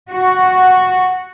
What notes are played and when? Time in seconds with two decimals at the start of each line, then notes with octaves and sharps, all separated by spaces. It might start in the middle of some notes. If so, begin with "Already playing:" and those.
0.10 F#4